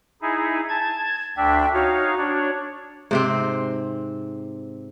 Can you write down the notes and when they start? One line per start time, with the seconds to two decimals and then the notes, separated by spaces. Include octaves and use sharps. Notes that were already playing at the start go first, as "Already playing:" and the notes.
0.22 D#4 E4 G#4
0.69 A5 G#6
1.37 D2 D4 E5 G5
1.74 D#4 F#4 C#5 F5
2.17 D4 C#5
3.11 G#2 C3 C4